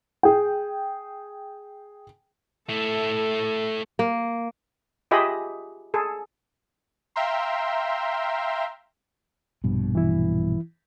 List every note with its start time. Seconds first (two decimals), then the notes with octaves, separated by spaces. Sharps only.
0.23 G#4 G5
2.69 A3 E4 A4
3.99 A#3
5.11 F4 G4 G#4 D#5 E5 B5
5.94 G#4 A4
7.16 E5 F5 G5 A#5 C6
9.64 A#1 G2 B2
9.95 E3 E4